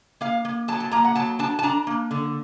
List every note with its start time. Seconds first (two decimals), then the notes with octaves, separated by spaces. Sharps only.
0.21 A#3 F5
0.45 A#3
0.68 F#3 A5
0.80 A5
0.91 A#3 A#5
1.05 F#5
1.15 F#3 A5
1.39 D4 A5
1.59 A5
1.63 D4 A#5
1.87 A#3
2.11 D3